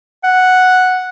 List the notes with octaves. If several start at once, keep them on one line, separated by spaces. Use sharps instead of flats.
F#5